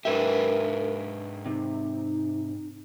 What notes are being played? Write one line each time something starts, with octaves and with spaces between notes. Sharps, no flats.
G#2 D4 G4 A#4 B4 E5
C3 D#4